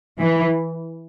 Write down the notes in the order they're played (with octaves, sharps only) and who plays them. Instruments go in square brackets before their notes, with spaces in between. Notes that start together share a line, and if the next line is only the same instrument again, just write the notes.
[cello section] E3